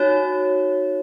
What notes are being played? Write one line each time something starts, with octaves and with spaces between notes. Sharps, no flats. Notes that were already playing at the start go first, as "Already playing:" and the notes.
Already playing: D#4 F#4 C#5